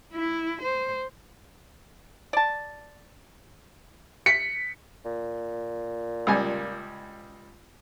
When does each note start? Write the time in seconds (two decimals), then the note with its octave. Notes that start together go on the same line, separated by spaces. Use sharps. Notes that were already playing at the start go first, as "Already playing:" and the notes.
0.13 E4
0.62 C5
2.33 D5 A5
4.26 B6 C#7
5.05 A#2
6.27 C#2 G3 G#5